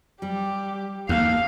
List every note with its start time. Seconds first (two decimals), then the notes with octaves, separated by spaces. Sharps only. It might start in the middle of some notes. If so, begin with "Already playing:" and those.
0.22 G3 G4
1.09 D#2 A3 A#3 F5